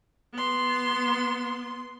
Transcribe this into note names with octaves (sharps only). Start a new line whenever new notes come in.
B3 C6